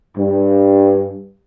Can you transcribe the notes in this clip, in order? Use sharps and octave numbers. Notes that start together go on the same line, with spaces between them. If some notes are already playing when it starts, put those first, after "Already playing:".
G2